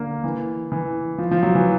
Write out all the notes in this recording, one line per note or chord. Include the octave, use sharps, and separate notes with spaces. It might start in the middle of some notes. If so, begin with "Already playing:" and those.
Already playing: D3 A#3
E3
E3
F3
F3
F#3
E3